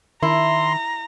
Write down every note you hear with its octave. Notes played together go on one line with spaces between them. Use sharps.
D#3 E4 A#5 C6